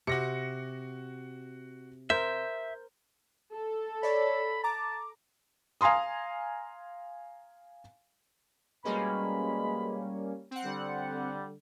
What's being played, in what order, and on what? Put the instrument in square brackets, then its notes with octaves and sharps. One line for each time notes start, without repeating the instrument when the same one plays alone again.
[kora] C3 [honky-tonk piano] F#4 A#6 C#7
[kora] A#4 C5 [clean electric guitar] E5 [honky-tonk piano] G6
[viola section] A4
[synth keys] C#5 D5 [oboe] B5
[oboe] A5 [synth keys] A#5 D6
[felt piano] F5 G#5 A#5 C6 D#6
[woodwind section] B2 G#3 B5 [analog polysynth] G3 A#3 C#4
[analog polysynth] C4 F#5
[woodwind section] D3 G3